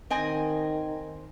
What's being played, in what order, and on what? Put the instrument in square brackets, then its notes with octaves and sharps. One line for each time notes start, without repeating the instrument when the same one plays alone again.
[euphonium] D#3 [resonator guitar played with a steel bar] C4 D#5 G#5